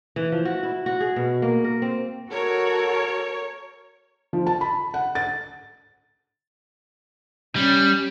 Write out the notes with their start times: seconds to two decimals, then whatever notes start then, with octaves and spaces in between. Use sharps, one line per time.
0.16 E3
0.32 F3
0.45 F#4
0.63 E4
0.86 F#4
1.00 G#4
1.16 B2
1.42 A#3
1.64 A#4
1.82 C4
2.32 F#4 A4 A#4 C#5
4.33 F3
4.47 A5
4.61 B5
4.94 F#5
5.15 A6
7.56 G3 C#4